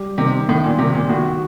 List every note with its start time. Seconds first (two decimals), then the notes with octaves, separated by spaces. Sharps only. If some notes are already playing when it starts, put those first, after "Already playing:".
Already playing: G3
0.18 C3 D#3
0.48 A2 D#3
0.64 A#2
0.79 C3 D#3
0.95 A#2
1.09 A2 F#4